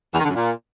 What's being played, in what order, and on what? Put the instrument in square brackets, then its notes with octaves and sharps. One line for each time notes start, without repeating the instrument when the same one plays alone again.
[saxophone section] E2
D#3
D3
F#2
A#2